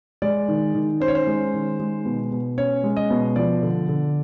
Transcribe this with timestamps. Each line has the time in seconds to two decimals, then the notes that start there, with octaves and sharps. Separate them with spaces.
0.22 G#3 D5
0.48 D#3
0.75 D#3
1.00 C#4 C5
1.08 C#5
1.15 C5
1.27 G#3
1.54 D#3
1.80 G#3
2.05 B2
2.32 B2
2.58 C#4 C#5
2.84 G#3
2.97 D#5
3.11 B2
3.36 F3 D5
3.63 D3
3.89 D3